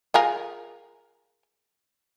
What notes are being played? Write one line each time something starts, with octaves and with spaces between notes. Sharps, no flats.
F4 G#4 A#4